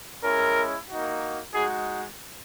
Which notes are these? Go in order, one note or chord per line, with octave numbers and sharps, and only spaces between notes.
G#3 C#4 E4 A#4
A#3 D#4 F#4
G#3 D#4 F#4 G#4